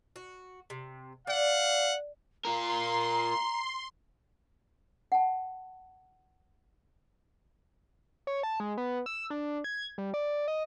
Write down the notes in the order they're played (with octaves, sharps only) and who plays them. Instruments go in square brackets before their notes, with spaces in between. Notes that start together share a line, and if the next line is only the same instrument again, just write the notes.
[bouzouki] F#4
C3
[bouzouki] D5 [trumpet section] F5 F#5
[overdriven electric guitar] F4 A#4 [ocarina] A#5 [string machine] C6
[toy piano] F#5 A5
[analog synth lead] C#5
A5
G#3
B3
E6
D4
G#6
G3
D5
D#5